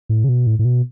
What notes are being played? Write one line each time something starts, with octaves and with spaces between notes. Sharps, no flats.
A2
C#3
B2
A2
A2
B2